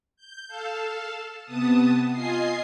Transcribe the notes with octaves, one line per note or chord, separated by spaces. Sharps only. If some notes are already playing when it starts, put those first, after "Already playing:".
G6
A4 F5 A5
C3 B3 A5 D#6
F4 D#5 G#5 C7